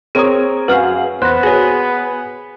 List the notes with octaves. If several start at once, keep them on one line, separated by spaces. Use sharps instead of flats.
C4 G#4 A#4 C#5 D#6
F#2 F#4 G#4 B4 F5 F6
E2 B3 C5 F#6 A#6
F#4 G#4 B4 C#5 A#6